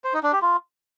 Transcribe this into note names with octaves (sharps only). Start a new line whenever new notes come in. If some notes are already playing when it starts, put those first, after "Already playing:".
C5
D#4
D4
G4
F4